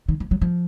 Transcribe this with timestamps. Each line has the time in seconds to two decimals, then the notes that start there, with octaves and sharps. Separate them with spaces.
0.08 D#3
0.20 F3
0.31 F#3
0.42 F3